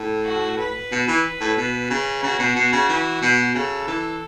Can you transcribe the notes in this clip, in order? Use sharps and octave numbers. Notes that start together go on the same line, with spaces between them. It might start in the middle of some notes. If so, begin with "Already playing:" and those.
Already playing: A2
F#4
B4
B2
E3
A2
B2
C#3
C#3 F#4
B2
B2
C#3
E3
B2
C#3 A4
E3